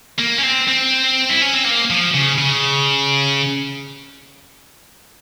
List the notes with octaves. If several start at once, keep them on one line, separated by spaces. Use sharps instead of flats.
A#3
C#4
C4
C4
E4
C#4
C4
A#3
F3
C#3
C#3